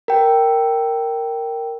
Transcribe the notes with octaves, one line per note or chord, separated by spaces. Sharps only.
A#4 G5